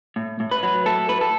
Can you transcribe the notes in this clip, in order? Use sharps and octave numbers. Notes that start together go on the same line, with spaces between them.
A2
A2
B4
F#3
A3 A4
A2 B4
A4